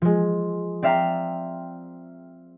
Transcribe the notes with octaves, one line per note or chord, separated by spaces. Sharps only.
F3 G#3
C4 D5 E5 F5 G5 A#5